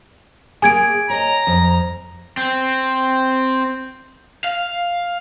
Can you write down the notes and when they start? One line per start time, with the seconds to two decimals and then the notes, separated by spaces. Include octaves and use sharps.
0.62 A#3 G#4 G#5 G#6 D7
1.10 C#5 D#5 A#5
1.47 F2
2.37 C4
4.44 F5